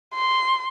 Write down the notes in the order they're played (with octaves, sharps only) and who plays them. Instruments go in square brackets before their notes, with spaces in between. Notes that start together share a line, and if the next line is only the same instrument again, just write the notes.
[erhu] C6